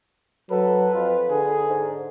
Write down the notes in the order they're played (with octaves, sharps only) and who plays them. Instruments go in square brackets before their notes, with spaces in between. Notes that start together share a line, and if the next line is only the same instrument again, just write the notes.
[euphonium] F#3 [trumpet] A4 [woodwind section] B4
[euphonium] F2 [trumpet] F4
[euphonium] D3 [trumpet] G#4
[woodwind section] G#2